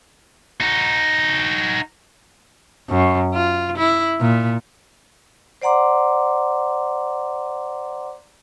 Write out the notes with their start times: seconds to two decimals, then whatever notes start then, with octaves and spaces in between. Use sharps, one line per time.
0.60 D#4 F#4
2.89 F#2
3.34 F4
3.77 E4
4.21 A#2
5.62 C5 D5 F#5 A#5 C6 D6